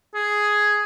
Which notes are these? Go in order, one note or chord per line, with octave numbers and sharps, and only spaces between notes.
G#4